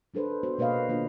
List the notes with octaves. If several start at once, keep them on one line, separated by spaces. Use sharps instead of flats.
F#3 D4 A4 B4 C5
B3 F#4 C5
B2 A#3 B4 C#5 D#5 F5
D#3 A#3 D4 F4 B4